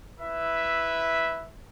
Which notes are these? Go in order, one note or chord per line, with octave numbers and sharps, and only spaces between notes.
E4 B4 E5